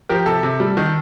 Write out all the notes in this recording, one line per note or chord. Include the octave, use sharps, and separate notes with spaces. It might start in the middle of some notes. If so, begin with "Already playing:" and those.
F3 G4 A#4
C3 A4
C3
G3
D#3